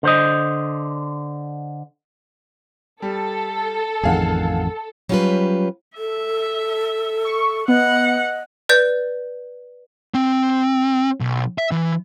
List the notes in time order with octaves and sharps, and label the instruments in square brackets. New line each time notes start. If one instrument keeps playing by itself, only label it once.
[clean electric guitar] D3 C5 D#5
[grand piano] G3 [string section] A4
[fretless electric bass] A1 F2 D#3 [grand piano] G#4 F5 F#5
[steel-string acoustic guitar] F#3 G3 C#4 F4 G4 B4
[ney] A4 [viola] E5
[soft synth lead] C#6
[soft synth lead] B3 [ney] D#5 [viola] F#5
[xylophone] B4 D5 G6
[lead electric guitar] C4
B1
E5
E3